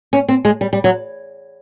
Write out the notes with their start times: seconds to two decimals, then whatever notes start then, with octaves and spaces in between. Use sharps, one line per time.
0.13 C#4
0.29 C4
0.45 G#3
0.61 G3
0.73 G3
0.84 F#3